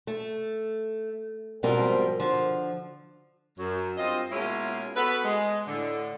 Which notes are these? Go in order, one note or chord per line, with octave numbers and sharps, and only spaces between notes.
A3
G#2 B2 F3 G3 C4 A#4
D3 F3
F#2 F#3
G2 C4 F4 D#5
B2 G#3 A#3 C#4 E4 F4
B3 F#4 A4 B4
G#3
A2 D3